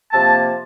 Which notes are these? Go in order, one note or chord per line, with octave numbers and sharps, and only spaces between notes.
C3 F3 A#3 A5